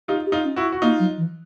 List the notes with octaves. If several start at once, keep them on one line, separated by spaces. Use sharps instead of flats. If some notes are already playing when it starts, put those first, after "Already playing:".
D#4 F4 G4
G4
D#4 F4
C#4
E4 F#4
F#4
A#3 D#4 F4
F#3
E3